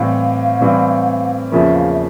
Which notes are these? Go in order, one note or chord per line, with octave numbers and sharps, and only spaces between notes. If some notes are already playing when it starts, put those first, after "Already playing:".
Already playing: A2 E3 G3 C4 F5
A2 E3 G3 C4
E2 C#3 F3 A#3 E5
F5
E5